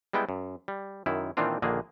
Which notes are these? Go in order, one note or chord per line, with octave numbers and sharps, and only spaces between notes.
G3 G#3 B3 E4 G5
F#2
G3
F#2 D#3 E4
A#2 D#3 E3 C4 D4 F4
A#1 D3 D#3 A#3 G#4